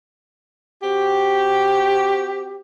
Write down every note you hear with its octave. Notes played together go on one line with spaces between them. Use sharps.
C4 F#4 G4